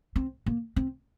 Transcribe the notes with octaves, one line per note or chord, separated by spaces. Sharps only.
C4
A#3
C4